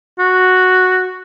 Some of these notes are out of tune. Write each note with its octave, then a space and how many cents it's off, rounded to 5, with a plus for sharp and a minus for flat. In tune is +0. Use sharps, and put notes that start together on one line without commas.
F#4 -5